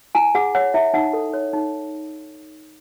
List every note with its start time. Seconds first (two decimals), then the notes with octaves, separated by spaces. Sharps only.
0.15 E4 G#5
0.35 G#4 F#5
0.55 C#5 F#5
0.74 E4 E5
0.94 D#4 F#5
1.13 A4
1.33 C#5
1.53 D#4